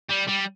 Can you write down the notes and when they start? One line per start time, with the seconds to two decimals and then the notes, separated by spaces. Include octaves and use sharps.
0.10 G3
0.28 G3